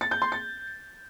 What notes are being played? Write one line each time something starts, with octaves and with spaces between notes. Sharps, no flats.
A6
G6
C6
A6